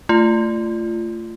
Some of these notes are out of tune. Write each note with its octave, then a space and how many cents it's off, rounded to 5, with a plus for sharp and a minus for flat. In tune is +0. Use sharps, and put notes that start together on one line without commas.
A3 +20 F4 -25